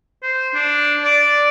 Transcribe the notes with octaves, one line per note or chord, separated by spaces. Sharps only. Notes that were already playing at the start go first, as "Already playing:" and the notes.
C5
D4
D5